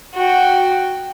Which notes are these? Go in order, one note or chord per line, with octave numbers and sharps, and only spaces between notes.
F#4 G5